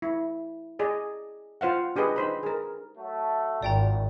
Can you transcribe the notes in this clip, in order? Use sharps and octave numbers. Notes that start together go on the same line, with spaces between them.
E4
G#4 D5 D#5
F4 C5 F5 F#5
D4 G4 G#4 B4 D#5
D#4 C5 B5
G#4 A#4
F#3 A3
G#1 F#2 A#2 D5 G5 A#5